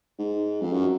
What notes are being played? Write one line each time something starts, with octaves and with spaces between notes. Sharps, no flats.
G#2
F2
F#2